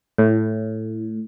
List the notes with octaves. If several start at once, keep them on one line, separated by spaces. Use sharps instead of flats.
A2